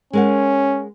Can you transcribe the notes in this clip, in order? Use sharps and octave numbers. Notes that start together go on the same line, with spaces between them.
G#3 C#4 A#4 F#5